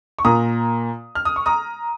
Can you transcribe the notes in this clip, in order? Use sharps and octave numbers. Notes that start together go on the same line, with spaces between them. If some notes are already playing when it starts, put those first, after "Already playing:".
C#6
A#2 A#3 A#5 D#6
F6
D#6
C#6
A#5 D#6